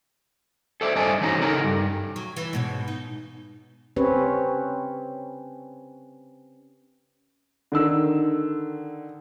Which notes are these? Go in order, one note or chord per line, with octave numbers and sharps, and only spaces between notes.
A4 C5 D5 E5
G2 D4 C5 D#5 G#5 A5
E3 F#3 C#4 D#4 A4 A#5
C#3 D#4 A4 A#4 A#5
G2
F#3
E3
G#2 B2 C#5
D#4
C4 C#4 G4 B4 C#5
D3 D#3 E6